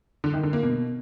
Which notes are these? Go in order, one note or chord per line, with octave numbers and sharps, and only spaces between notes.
D3
D#3
D3
A#3
B2